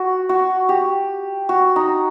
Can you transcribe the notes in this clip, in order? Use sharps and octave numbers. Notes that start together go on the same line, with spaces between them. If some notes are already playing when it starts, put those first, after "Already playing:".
Already playing: F#4
F#4
G4
F#4
D#4